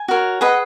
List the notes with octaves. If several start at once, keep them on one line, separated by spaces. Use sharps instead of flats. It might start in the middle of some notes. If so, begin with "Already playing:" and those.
Already playing: G#5
F#4 A#4 C#5
G#4 B4 D#5 F#5